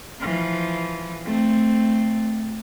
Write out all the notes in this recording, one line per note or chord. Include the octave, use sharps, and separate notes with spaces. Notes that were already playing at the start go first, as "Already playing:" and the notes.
E3 F3
A3 C4